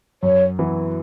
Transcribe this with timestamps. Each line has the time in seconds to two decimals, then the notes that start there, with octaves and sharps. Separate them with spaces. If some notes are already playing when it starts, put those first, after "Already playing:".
0.23 F#2 C#5
0.59 E3 B3 E4